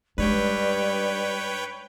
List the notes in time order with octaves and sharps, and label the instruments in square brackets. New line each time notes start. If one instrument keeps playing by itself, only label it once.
[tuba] G2 [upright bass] G#3 D#4 [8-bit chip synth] B4 C#5 G5 [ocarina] D5